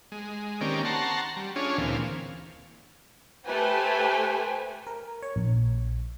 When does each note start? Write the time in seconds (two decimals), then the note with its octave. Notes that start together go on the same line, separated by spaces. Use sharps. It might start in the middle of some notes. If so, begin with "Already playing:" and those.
0.12 G#3
0.61 D#3 A#3 C4 C#4 G4 D5
0.85 F#5 A5 A#5 C6 C#6
1.36 G3
1.56 C#4 D4 F4 G#4 C#5
1.78 D2 A#2 E3 C4 F5
3.47 A3 G4 B4 C5 G#5
4.87 A#4
5.22 C#5
5.36 A#1